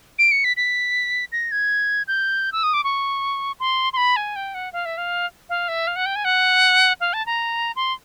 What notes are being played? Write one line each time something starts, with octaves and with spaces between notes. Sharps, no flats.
D7
C#7
B6
B6
A#6
G#6
G6
E6
D#6
D6
C#6
C6
C6
B5
G#5
G5
F#5
F5
E5
F5
F5
E5
F5
F#5
G5
G#5
F#5
F5
A5
A#5
C6